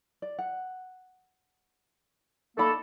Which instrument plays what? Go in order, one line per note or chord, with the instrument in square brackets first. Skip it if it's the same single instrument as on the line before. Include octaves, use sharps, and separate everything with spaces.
[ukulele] D5
F#5
[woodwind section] A3 A#3 A4 [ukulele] D#4 D5 B5